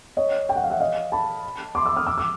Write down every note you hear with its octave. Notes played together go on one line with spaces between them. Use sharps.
C#5 D#5
G5
F#5
F5
E5 F#5
D#5 F5
A5 B5
C6 D6
D6 E6
D#6 F6
D6 E6
D6 E6